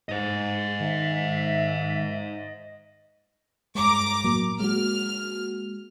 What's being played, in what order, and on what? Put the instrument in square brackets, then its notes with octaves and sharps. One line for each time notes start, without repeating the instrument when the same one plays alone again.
[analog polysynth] G#2 [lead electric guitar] C5 D#5
[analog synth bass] D#3 [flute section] E5
[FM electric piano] G2 G#3 [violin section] A#5 D6
[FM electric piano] A2 F#3 A#3
[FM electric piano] G#3 A#3 F#4 [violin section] F6